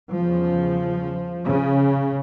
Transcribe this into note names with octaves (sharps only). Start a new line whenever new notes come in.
E2 C#3 F3
C#3